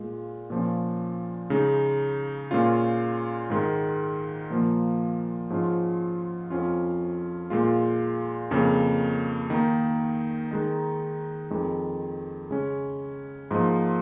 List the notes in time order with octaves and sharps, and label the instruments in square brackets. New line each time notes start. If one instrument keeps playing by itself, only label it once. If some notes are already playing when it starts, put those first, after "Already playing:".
Already playing: [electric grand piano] A#2 G#3 F4
A#2 F3 C#4
C#3 G#3 D#4
A#2 G#3 C#4 F4
G#2 D#3 G#3
A#2 F3 A#3
G#2 F3 C#4 F4
F2 F3 C#4 F4
A#2 G#3 F4
F2 C#3 A#3
D#3 A#3 D#4
D#3 G#3 D#4
F2 D#3 G#3
C#3 G#3 C#4
G#2 F3 A#3 D#4